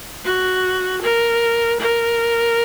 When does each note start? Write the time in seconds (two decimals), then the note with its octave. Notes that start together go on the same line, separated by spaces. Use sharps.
0.24 F#4
1.01 A#4
1.80 A#4